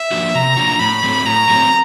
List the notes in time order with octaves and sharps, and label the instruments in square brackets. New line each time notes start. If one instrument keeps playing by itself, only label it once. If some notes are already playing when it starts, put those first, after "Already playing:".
Already playing: [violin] E5
[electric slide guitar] F3 A#3 D4 F#4
[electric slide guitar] C3 [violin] A#5
[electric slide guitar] F3 A#3 D4 F#4
[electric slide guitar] A2 [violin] B5
[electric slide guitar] F#3 A3 C4
[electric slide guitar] A2 [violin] A#5
[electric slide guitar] F#3 A3 C4